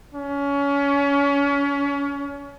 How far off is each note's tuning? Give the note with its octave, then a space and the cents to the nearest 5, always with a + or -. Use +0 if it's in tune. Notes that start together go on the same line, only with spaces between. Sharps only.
C#4 +30